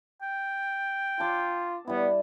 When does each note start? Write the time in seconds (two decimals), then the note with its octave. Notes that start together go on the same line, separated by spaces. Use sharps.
0.22 G5
1.20 F4 A5 D6
1.87 G3 B3 E4